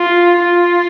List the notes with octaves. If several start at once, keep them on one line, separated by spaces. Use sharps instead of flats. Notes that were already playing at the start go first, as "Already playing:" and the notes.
Already playing: F4
F4